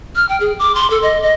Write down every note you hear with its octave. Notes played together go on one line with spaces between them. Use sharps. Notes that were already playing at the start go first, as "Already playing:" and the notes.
F6
G5
G#4
D6
C6
A4
D#5
D#5